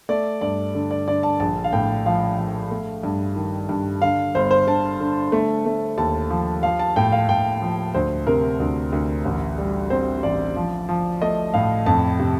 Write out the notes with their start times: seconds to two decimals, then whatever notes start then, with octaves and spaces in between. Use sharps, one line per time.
0.09 A3 D5
0.41 G2 D5
0.75 D3
0.91 D5
1.08 D3 D5
1.23 A5
1.40 A#1 A5
1.64 F5
1.73 A2 G5
2.06 F3 F5
2.39 F3
2.71 A3
3.03 G2
3.36 D#3
3.69 G2
4.02 D3 F5
4.35 G1 C5
4.51 C5
4.67 D3 A5
5.00 D3
5.32 A3
5.66 A3
5.97 D#2 A5
6.30 F3
6.63 F3 F5
6.79 A5
6.96 A2 G5
7.12 F5
7.29 A2 G5
7.62 F3
7.94 D2 C5
8.27 C3 A#4
8.60 D2
8.92 D2
9.25 A1
9.58 G3
9.90 C4 C5
10.23 A1 D5
10.56 F3
10.89 F3
11.22 A3 D#5
11.54 A2 F5
11.86 F2 A5
12.19 C3